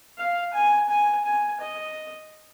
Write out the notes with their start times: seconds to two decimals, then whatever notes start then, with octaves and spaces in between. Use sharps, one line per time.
0.18 F5
0.53 G#5
0.89 G#5
1.25 G#5
1.60 D#5